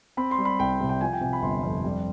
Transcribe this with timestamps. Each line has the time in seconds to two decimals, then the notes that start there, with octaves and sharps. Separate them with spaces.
0.17 C4 B5
0.31 C6
0.38 G3
0.45 B5
0.59 C2 G5
0.80 C3
0.89 G5
1.01 F3 G#5
1.13 G5
1.21 C3 G#5
1.33 B5
1.42 G1 C6
1.63 F2
1.84 G3